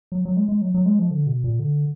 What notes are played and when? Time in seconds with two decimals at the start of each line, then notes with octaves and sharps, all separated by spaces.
0.12 F#3
0.25 F#3
0.37 G#3
0.49 G#3
0.62 F#3
0.74 F#3
0.86 G#3
0.99 F3
1.11 D3
1.27 B2
1.44 A#2
1.59 D3